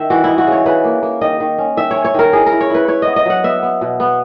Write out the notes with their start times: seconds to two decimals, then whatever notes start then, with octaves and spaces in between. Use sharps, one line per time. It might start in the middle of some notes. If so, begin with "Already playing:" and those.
Already playing: D#3 E5
0.10 E3 F#4
0.24 D#4 E4
0.38 F#4
0.47 C#3
0.52 C#5
0.66 C#3 B4
0.84 A#3
1.03 A#3
1.21 D#3 D#5
1.40 D#3
1.58 C#4
1.77 D#3 E5
1.91 C#4 C#5
2.05 C#5
2.14 D#3 A#4
2.33 E4 G#4
2.46 A#4
2.52 E4
2.61 C#5
2.70 E4 B4
2.88 E4 C#5
3.02 B3 D#5
3.16 D#5
3.26 F#3 F#5
3.44 B3 E5
3.63 B3
3.81 B2
4.00 B3